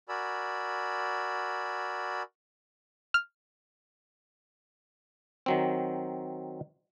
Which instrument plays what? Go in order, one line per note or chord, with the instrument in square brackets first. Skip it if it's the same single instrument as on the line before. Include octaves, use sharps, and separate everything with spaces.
[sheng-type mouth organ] F#4 A#4 D5 G#5 B5 E6
[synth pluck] F6
[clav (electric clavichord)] D#3 F#3 C4